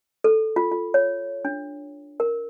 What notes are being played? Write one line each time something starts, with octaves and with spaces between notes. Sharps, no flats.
A4
F4
F4
C#5
D4
A#4